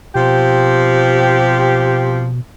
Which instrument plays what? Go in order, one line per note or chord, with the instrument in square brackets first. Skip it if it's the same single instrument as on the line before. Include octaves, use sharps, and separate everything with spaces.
[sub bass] B2 [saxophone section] F3 C4 G4